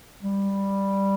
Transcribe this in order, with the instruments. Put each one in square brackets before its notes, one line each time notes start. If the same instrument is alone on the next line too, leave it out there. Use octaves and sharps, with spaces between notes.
[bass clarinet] G3